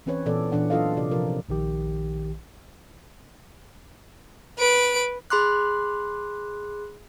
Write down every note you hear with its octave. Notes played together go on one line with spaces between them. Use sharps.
E3 C4 C#4 B4 C#5
A#2 E3 B3 A4 D5
A#2 E3 D4 F#5
F#3 D4 F4 A4 D#5 F5
C3 D5
C3 F3 A#4
A#1 D#3 G4
B4 D7
G#4 B5 C6 D6 F#6